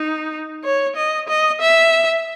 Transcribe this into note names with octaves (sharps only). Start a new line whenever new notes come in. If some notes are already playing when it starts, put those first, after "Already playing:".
Already playing: D#4
C#5
D#5
D#5
E5